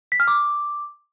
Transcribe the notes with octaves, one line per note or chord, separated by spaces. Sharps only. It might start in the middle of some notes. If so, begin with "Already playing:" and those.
B6
F6
D6